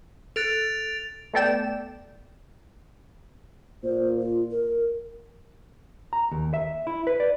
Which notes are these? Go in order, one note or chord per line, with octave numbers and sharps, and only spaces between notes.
A4 F#6 A6 D7 F7
A3 B3 A4 D5 G5 E7
A#2 C5
F4
A#4
A#5
D#2
E5
E4
B4
D5